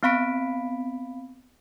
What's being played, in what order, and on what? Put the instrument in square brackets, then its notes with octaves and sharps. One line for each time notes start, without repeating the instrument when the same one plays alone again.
[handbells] B3 C4 F5 B5 B6 D7